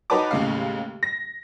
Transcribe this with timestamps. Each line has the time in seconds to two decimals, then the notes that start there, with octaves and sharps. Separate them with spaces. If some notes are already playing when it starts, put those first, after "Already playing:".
0.10 D#4 F#4 B4 C#5 A5 D6
0.31 D#2 A2 C#3 G#3 F5
1.03 A#6